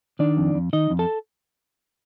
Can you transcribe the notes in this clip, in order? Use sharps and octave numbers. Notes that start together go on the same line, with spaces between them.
D#3 D4 D5
F2
F2
D#3 D#4 D#5
F2
A4 A5